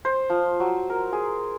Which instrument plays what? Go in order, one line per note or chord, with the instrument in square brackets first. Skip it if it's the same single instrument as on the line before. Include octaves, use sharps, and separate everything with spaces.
[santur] C5
F3
F#3
A#4
G#4